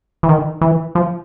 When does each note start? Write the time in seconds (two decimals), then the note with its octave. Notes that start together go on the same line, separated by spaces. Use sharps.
0.23 E3
0.29 D#3
0.61 E3
0.95 F3